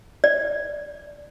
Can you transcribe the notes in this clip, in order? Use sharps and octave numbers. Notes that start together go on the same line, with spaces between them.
D5